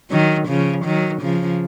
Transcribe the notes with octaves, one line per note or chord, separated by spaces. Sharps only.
D#3 F#3
C#3 F3
D#3 F#3
C#3 F3